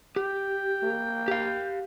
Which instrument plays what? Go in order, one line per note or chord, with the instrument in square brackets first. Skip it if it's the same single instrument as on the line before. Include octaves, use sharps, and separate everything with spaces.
[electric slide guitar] G4 [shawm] G5
[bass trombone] A#3
[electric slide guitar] G4 F5